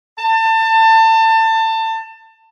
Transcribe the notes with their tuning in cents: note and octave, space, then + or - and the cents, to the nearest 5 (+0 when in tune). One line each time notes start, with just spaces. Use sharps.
A5 +25